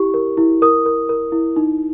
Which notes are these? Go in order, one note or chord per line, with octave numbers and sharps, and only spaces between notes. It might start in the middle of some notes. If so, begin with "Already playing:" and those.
Already playing: E4 G4 C#6
A#4
E4
A#4 D#6
A#4
A#4
E4
D#4